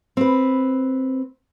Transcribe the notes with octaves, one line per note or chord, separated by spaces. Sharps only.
C4 B4